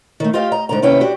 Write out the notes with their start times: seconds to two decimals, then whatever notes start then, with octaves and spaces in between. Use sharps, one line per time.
0.20 D#3 A3
0.34 F4 G4 D#5 F5
0.52 D#5 A#5
0.69 G#2 D3 A#5
0.82 D#2 C3 C#4 E4 B4 G5
1.01 D4 F#4 G4